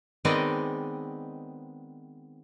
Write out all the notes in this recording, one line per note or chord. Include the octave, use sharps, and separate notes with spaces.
D#3 G#3 B3 C4 D5 D#5